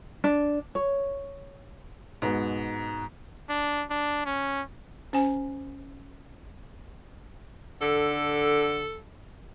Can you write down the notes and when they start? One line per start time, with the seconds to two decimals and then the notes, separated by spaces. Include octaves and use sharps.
0.24 D4
0.75 C#5
2.22 G#2 B2 B3
3.49 D4
3.90 D4
4.26 C#4
5.13 C#4 C5 G#5
7.81 D3 A4